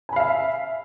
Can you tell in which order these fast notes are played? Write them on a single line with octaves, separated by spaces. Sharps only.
G#5 B5 F5 E5